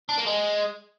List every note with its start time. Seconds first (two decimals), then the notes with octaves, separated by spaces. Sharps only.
0.09 D4
0.18 A#3
0.26 G#3